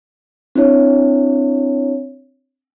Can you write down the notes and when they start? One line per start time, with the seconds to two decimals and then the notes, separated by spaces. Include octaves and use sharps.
0.55 C4 D4 E4 C#5